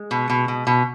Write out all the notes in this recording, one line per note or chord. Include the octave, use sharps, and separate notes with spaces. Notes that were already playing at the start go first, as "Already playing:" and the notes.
Already playing: G#3
B2
B2
B2
B2